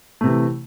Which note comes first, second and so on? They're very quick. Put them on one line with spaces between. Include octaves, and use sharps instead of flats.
A3 C3 E3